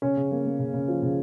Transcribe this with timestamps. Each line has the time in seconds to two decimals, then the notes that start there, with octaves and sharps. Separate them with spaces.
0.02 C#3 C#4
0.16 C#3
0.32 A#3
0.46 A#3
0.59 C#3
0.74 C#3
0.88 F3
1.02 C#3